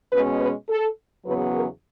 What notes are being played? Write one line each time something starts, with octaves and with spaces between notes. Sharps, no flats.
B2 G#3 C#4 B4
B4
A4
E2 C#3 F#3 B3 B4
A#4